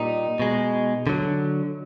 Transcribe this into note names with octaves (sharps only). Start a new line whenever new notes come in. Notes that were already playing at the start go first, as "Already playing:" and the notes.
Already playing: A#2 G3 D#4
B2 G#3
D3 F#3